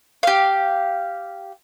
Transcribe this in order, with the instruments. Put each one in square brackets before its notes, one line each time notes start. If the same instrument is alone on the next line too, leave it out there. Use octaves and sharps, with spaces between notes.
[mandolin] G4 F5